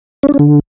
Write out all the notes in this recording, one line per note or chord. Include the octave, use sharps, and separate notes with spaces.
C#4
D4
C#4
D3